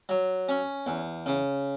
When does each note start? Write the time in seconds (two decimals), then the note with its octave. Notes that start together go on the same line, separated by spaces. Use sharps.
0.09 F#3
0.49 C#4
0.87 E2
1.26 C#3